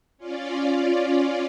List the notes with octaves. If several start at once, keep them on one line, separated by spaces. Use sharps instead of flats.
C#4 F4 D5